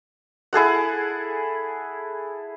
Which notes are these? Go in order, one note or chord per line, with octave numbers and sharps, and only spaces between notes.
E4 G#4 A4 F#5